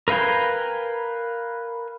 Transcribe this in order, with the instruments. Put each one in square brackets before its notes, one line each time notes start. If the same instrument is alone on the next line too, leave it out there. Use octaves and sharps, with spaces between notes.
[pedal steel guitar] A#4 B4 F5 G5 G#5